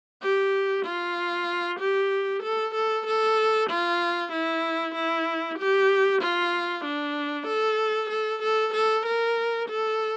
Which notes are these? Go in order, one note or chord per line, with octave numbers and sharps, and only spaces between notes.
G4
F4
G4
A4
A4
A4
F4
E4
E4
G4
F4
D4
A4
A4
A4
A4
A#4
A4